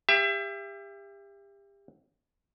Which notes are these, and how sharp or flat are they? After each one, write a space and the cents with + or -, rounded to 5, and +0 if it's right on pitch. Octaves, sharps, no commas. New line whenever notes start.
G4 +30 E5 +30